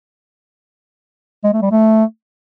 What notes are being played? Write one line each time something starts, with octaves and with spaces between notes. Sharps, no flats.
G#3
A3
G3
A3